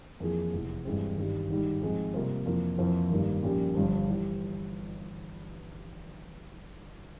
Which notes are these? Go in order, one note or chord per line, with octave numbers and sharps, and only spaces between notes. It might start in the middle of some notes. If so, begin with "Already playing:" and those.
F2 E3 A#3 F4 G#4
F1 E2 E3
G2 E3 G#3 C4
G#1 G2 G3
G#1 G#2 G3
G#2 F3 G#3 C4
C3 G3 A#3 F4 C5
F2 E3 A#3 F4
F2 E3 A#3 F4 C5
G#1 G2 G3 A#3
A#1 A#2 G3 C#4 G4
G1 G2 F3
E3 G3